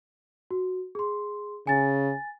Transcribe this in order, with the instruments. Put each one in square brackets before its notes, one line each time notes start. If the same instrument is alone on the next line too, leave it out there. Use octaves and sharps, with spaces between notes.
[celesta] F#4
G#4 C6
[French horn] C#3 [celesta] G#5 A6